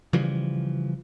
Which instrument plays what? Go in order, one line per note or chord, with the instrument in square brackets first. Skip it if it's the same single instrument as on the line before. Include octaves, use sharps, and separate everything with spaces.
[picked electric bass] C#3 E3 F3 G3